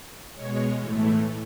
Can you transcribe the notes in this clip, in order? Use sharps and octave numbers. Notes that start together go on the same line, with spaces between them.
B2 G#3 C#5
A2 E3 A3